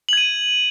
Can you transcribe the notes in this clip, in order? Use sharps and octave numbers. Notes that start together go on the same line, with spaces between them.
G#6 D#7 F#7